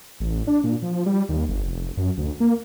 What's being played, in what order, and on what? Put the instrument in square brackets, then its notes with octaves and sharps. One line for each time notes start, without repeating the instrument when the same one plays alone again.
[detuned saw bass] A1
D4
A#2
F3
G3
D#2
G1
F1
F#2
D2
A#3